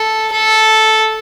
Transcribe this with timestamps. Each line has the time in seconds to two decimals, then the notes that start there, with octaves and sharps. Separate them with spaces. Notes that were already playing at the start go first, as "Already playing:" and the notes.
Already playing: A4
0.32 A4